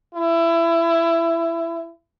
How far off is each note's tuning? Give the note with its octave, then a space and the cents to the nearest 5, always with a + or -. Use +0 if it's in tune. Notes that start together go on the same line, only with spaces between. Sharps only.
E4 +20